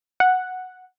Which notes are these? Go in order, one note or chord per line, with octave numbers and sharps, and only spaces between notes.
F#5